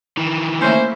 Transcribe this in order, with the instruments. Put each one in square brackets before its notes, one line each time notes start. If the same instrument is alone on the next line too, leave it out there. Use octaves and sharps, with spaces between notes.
[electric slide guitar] D#3 E3
[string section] A3 A#3 E4 [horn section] C#4 C5